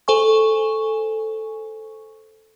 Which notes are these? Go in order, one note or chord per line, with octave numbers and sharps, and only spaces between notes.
A4 C5 G#5 C#6